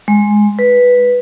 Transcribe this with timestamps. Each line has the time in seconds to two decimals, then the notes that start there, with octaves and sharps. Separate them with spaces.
0.08 G#3
0.59 B4